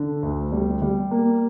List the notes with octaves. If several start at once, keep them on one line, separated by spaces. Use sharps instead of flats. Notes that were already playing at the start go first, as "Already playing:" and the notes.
Already playing: D3
D2
G3
G3
A#3